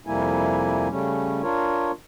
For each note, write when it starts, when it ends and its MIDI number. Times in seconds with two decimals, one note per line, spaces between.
0.07 0.88 41
0.07 0.88 48
0.07 0.88 55
0.07 0.88 58
0.07 0.88 64
0.07 0.88 80
0.90 1.42 49
0.90 1.42 55
0.90 1.42 57
0.90 1.42 61
1.43 1.91 62
1.43 1.91 65
1.43 1.91 70
1.43 1.91 73